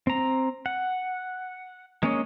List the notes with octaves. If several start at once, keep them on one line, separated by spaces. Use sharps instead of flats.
C4 A#5
F#5
G#3 A#3 C#4 C#5 D#5